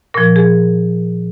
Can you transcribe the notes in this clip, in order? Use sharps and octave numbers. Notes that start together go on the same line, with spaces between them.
A#2 F3 A#4
G#4